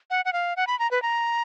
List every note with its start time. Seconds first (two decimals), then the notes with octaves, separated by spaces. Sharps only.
0.10 F#5
0.25 F#5
0.33 F5
0.57 F#5
0.67 B5
0.79 A#5
0.91 B4
1.02 A#5